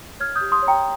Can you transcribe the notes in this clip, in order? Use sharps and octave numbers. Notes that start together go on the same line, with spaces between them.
C#5 F6 G#6
D#6 G6
G4
C6 D#6
C#5
G5 A#5